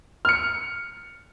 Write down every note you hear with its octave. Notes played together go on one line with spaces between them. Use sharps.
F6 C#7